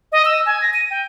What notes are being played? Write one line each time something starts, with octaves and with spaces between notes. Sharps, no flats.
D#5
E6
G#5
A#6
D#7
G5